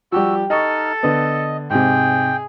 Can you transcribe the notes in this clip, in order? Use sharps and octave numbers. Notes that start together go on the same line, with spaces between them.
F3 G3 F#4 G4 E6
D#4 A4 D#5 C#6 F6
D3 B3 D#5
G#2 C3 G#4 G5